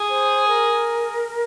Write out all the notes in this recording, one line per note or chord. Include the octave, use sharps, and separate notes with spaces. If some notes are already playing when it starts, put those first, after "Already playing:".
Already playing: G#4
C5
A#4